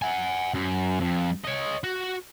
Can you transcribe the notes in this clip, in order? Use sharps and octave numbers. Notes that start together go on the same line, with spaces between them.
F#5 G#5
F#2
F2
C#5 D#5
F#4